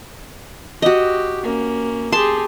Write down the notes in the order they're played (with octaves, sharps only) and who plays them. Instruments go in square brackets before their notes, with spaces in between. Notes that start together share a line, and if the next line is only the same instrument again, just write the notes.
[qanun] F#4 D#5 [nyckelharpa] G4
[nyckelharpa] A#3 C#4
[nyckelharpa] G4 G#4 [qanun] A5 C6